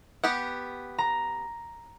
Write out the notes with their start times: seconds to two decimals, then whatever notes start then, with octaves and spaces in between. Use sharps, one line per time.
0.24 B3 G4 F#5
0.98 A#5